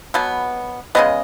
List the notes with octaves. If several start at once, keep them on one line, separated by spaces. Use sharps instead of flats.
B2 F#3 B3
C#3 G#3 B3 D#5